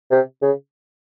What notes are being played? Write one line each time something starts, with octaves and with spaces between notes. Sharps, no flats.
C3
C#3